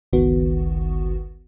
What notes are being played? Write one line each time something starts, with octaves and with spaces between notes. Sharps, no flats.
G1 C#2 D#3 B3 F#4